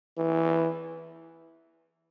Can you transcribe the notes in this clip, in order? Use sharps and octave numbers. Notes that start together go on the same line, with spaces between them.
E3